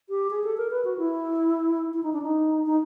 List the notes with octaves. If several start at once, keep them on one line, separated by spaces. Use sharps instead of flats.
G4
G#4
A4
A#4
B4
F#4
E4
E4
D#4
D4
D#4
D#4